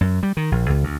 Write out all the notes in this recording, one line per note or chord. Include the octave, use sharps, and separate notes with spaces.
F#2
G3
D#3
A#1
C#2
D2